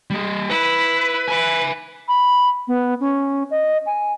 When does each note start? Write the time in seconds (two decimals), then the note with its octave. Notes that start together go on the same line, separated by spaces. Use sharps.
0.10 G3 D#5
0.50 E4 B4
1.28 B4 E5 G#5
2.08 B5
2.68 B3
3.00 C#4
3.51 D#5
3.86 G#5